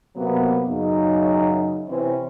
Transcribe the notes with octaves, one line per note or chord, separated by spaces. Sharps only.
C3 F#3 A#3 B3
F#2 C#3 D#4
C3 E3 C4 C#4